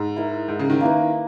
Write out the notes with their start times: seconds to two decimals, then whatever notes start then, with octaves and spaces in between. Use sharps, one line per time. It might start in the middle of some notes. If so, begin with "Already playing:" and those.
Already playing: G#2
0.16 E4 A#4 D#5
0.48 G#2
0.59 C#3
0.70 D#3
0.81 A#3 E4 B4